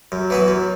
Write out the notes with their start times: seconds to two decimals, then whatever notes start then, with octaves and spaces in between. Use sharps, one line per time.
0.12 F#2 F#3
0.30 E3 B3 F#4
0.48 F#2